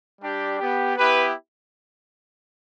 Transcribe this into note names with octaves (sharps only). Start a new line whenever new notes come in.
G3 D4 G4
B3 G4
B3 E4 G4 B4